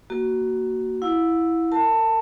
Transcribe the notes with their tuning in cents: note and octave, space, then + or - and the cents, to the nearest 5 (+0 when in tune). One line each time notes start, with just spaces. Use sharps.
A#3 +0 F#4 +15
E4 +0 F#5 -45
A#4 -35 A5 +15